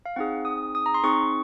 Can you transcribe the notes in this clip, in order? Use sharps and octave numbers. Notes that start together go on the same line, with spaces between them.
F5
C4 D#4 G#4 F#5
D#6
D#6
A#5
C6
C4 D#4 G#4 C#6